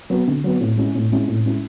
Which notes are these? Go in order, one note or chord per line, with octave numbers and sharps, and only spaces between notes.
F#3 B3
D3
F#3 B3
A2
G#3 C#4 E4
A2
G#3 C#4 E4
A2
G#3 C#4 E4